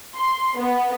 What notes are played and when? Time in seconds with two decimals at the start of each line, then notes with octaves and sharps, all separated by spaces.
0.15 C6
0.59 B3